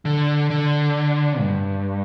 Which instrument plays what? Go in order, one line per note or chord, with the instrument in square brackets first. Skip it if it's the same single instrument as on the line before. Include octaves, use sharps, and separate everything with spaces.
[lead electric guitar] D3
D3
G2